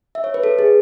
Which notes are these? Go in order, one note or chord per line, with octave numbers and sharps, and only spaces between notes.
E5
C#5
B4
A4
G#4